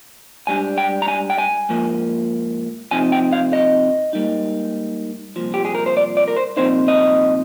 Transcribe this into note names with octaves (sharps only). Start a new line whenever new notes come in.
G#2 G3 D4 G#5
G5
A#5
G#5
G5
G#5
G#2 F3 A#3
C3 F3 C4 D#4 G#5
G5
F5
D#5
G#2 G3 A#3 D#4
C2 A#2 F3
G4
G#4
A#4
C5
D5
D5
A#4
C5
C2 A#2 F3 C4 D#4 C5
D#5